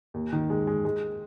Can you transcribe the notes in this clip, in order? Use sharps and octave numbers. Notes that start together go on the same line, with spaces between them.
D#2
D#3
G#3
G#3
G#3